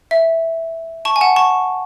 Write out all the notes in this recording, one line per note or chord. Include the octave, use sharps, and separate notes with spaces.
E5
A5 C#6
G#5
F#5 A5
A5 C#6